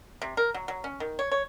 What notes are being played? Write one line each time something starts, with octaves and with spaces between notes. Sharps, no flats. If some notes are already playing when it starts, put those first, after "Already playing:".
C3
A#4
F#3
F#3
C#4
D#3
C#5
C#5